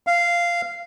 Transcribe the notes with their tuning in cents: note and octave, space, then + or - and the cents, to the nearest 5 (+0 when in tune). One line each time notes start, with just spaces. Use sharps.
F5 -10